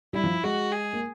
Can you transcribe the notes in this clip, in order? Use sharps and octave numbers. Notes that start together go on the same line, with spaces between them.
G3 E4
F3
G#3 F#4
G#4
A#3